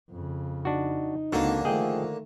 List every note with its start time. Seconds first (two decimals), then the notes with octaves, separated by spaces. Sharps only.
0.10 F2 C#3
0.65 D4 D#4 F#4
1.33 C#2 D3 A#3 C4 D4 F#4 A4
1.65 D#3 F3 A3 G#4 D#5 G5